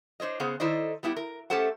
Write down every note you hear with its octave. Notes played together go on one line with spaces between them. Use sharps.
D4 C5 C#5 D#5
C#3 B3 G#4 C5 F#5
D#3 E4 A4 C5 D5 D#5
G3 B3 E4 G4
A#4
A3 C#4 G4 A4 C5 F#5